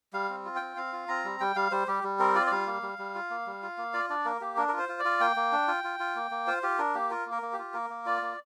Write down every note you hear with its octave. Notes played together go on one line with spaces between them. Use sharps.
G3 F5
C4
F4
G5
C4
C4 F5
F4
C4 A#5
G3
G3 G5
G3 F5
G3 C5
G3 G4
G3
C4 A#4
F4 D5
D5
G3 F5
A#3
G3
G3
F4
A#3
G3
F4
A#3
F4 D5
D4 D5
A#3 A#4
A#3 G4
D4 A#4
F4 A#4
C5
F4
D5
F4
A#3 G5
A#3
D4
F4
F4
F4
A#3
A#3
F4 C5
F4 G4
D4 A#4
A#3 G4
F4 A#4
A#3
A#4
A#3
G4
F4
A#3 A#4
A#3
F4 D5
A#3